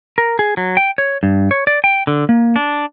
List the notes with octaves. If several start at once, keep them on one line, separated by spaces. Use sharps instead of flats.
A#4
G#4
F#3
G5
C#5
G2
C#5
D5
G5
D3
A#3
D4